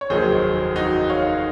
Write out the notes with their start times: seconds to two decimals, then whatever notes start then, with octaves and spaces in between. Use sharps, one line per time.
0.01 C#5
0.10 F1 D#2 D#3 F#3 G#4 C5
0.76 D#4 F#4
1.09 C#5 F5